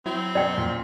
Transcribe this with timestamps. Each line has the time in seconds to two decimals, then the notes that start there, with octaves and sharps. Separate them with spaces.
0.06 F#3 C4 E4
0.35 F#2 B2 D5 G5
0.58 A#2